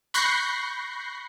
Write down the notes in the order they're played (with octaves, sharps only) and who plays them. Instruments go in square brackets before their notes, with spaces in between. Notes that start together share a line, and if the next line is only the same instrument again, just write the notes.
[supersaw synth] B5 C#6 F#6 G6 A#6 C7